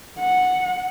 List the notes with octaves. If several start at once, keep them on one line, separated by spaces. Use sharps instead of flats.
F#5